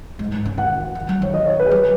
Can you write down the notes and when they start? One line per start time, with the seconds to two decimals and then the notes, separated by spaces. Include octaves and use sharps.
0.19 G#2
0.32 G#2
0.45 C#3
0.58 D#3 F#5
0.95 D#3
1.09 F#3
1.22 D#3 C#5
1.34 D#5
1.46 C#5
1.60 B4
1.66 G#4
1.71 F#3 B4